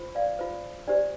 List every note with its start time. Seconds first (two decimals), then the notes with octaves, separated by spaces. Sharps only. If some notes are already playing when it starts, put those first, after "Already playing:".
Already playing: F4 C5
0.15 D5 F5
0.39 F4 C5
0.88 D4 G4 C5 D5